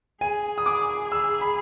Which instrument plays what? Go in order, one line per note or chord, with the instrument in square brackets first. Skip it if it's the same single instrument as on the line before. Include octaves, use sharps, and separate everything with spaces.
[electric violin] G#4 [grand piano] G#5
[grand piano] D#6
D6
E6
B5